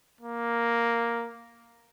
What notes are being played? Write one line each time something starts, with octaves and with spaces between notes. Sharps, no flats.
A#3